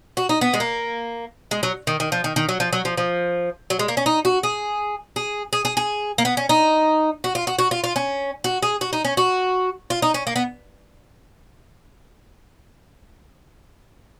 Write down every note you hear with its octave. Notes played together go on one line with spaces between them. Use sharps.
F#4
D#4
B3
G#3
A#3
G#3
F#3
D#3
D#3
F3
D#3
D#3
F#3
F3
F#3
F3
F3
F#3
G#3
A#3
C#4
D#4
F#4
G#4
G#4
G#4
G#4
G#4
A#3
B3
C#4
D#4
F#4
F4
F#4
F#4
F4
F4
C#4
F#4
G#4
F#4
D#4
C#4
F#4
F4
D#4
C#4
A#3
B3